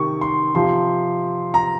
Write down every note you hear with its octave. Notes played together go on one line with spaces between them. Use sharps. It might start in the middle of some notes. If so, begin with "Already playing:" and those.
Already playing: C3 D#3 C#6
C6
C3 F3 C6
A#5